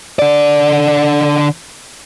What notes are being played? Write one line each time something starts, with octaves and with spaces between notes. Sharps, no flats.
D3 D5